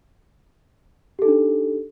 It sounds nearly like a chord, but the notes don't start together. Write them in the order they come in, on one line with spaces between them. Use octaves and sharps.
G4 A4 D#4 D4